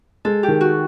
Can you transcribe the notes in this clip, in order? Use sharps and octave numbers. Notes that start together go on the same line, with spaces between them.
G#3 A4
G4
D#3
F#4